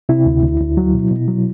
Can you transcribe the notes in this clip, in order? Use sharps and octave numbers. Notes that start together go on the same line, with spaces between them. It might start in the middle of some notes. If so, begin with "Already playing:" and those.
C3 E4
D2
D2
D2
F#3
B2
B2
F#3